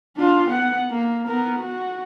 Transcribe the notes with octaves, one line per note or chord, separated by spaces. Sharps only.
D4 F4
B3 F#5
A#3
B3 A#4
F#4